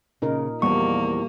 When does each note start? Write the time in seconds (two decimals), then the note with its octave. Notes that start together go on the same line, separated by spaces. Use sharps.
0.22 A#2 C#3 D#4 A#4
0.62 E2 F3 G3 A#3 C#6